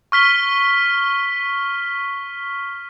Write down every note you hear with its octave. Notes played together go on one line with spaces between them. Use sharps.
C#6 F6 B6 G7